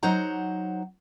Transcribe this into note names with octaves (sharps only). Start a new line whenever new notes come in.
F#3 D#4 C5 F#5 A#5